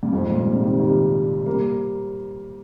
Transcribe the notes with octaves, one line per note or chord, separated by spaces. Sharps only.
G2
F2 G#2
G2 A#2
G#2 C3
C3 D#3
D#3 G3
G3 A#3